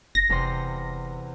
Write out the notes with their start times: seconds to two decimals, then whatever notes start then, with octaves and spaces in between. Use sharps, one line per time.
0.15 F#1 A#6
0.30 F1 E2 C3 C6